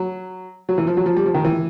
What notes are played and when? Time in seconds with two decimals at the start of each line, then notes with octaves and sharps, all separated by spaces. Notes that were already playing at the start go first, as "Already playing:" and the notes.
Already playing: F#3
0.69 F#3
0.78 E3
0.87 F3
0.97 F#3
1.06 F3
1.16 G3
1.26 F3
1.34 D#3
1.45 E3